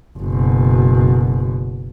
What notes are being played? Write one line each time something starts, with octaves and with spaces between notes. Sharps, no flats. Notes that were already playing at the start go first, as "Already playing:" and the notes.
F#1 B2